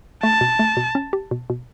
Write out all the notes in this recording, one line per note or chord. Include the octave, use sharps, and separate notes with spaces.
A3 A5
B2
A3
B2
C#4
G4
B2
B2